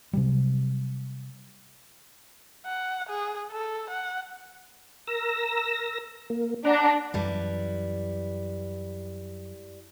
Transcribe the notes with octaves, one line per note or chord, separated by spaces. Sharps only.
C3 F#3 G3
F#5
G#4
A4
F#5
A#4 E6 A#6
A#3
D4 D5 F#5 A#5
F#2 E3 G3 E4 B4